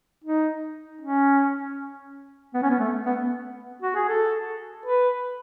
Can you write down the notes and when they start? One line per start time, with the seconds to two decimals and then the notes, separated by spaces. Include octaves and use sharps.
0.24 D#4
1.01 C#4
2.54 B3
2.63 C#4
2.70 B3
2.80 A3
3.06 B3
3.82 F#4
3.96 G#4
4.09 A4
4.86 B4